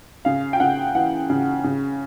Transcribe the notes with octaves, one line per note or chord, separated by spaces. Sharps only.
C#3 F5
G5
C#3 F#5
E3 F#5
C#3
C#3